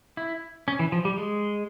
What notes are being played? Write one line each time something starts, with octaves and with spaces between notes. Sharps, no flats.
E4
C#4
E3
F3
G3
G#3